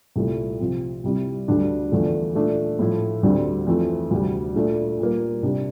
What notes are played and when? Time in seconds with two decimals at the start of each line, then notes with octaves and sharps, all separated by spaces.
0.16 C2 A#2 A3 E4
0.60 C3 F3 C4
1.04 C3 G3 C4 E4
1.48 D2 D3 G3 D4
1.92 E2 D3 F3 A3
2.35 A#2 A3 D4
2.79 A2 F3 A3 E4
3.23 D2 D3 G3 C4
3.67 F2 E3 A3 C4
4.11 D2 C3 G3
4.56 A#2 A3 D4
4.99 A#2 G3 A#3
5.43 C3 G3 D4